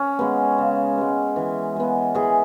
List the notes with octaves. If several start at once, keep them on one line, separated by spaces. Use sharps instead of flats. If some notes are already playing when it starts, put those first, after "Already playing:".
Already playing: C#4
G#3 B3
C#3
G#3 B3
E3
G#3 B3
E3 G#4